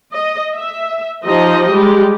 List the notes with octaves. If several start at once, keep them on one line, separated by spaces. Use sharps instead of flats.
D#5
E5
F3 D#4 G4 D#5
G3 G#3 G4